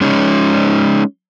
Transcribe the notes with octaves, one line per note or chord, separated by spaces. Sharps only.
G#3 C#4 D#4